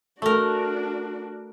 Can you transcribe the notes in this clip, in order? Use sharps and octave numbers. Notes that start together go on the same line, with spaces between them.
A3 D4 F#4 A#4